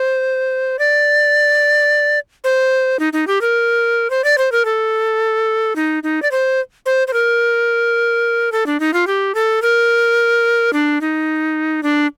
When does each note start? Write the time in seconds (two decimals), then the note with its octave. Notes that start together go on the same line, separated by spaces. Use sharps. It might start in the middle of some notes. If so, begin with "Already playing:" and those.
Already playing: C5
0.79 D5
2.44 C5
2.99 D#4
3.13 D#4
3.27 G4
3.41 A#4
4.10 C5
4.24 D5
4.38 C5
4.52 A#4
4.65 A4
5.76 D#4
6.03 D#4
6.22 D5
6.31 C5
6.86 C5
7.07 C5
7.13 A#4
8.52 A4
8.66 D4
8.80 D#4
8.93 F4
9.07 G4
9.35 A4
9.62 A#4
10.73 D4
11.01 D#4
11.83 D4